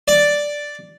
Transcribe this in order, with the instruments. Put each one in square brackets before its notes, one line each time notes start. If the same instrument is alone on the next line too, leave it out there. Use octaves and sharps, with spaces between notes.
[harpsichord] D5